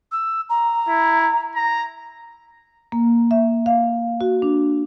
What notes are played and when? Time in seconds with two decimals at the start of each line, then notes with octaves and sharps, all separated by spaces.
0.12 E6
0.50 A#5
0.88 E4
1.56 A#5
2.92 A#3
3.31 E5
3.66 F5
4.21 F#4
4.42 D4